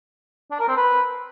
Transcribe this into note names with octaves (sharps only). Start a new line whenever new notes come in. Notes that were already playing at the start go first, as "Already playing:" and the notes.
D4
A#4
C4
B4